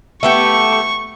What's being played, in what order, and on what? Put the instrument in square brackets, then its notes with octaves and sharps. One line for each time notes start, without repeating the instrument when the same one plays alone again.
[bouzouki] A3 B3 G4 [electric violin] C#6